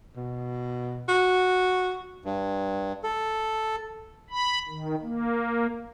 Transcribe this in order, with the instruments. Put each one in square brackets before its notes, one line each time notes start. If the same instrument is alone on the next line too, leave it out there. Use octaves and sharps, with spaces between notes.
[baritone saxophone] B2
F#4
[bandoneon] G2
A4
[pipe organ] B5
D#3
A#3